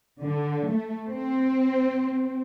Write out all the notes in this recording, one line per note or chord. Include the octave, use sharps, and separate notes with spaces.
D3
A3
C4